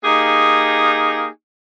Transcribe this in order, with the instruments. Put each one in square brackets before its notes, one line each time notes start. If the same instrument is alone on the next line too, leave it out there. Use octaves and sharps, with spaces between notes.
[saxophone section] A#3 D#4 G4 G#4